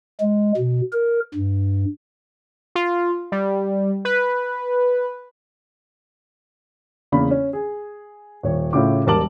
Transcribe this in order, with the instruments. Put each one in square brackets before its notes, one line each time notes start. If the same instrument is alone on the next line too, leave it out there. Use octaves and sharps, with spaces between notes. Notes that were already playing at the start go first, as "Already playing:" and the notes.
[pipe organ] G#3
B2
A#4
G2
[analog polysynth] F4
G3
B4
[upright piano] E2 C#3 A#3 B5
C#4
G#4
D#1 C#5
A2 C#3 E4 F4 D6
E1 G3 A#4 A5 D6 F#7